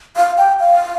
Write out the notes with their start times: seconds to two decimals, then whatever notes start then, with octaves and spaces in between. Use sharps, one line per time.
0.17 F5
0.38 G5
0.60 F5